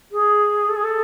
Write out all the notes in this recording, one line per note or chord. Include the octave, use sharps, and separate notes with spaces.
G#4
A4
G#4
A4